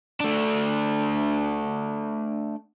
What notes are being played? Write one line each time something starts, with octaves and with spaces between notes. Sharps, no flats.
A3 D4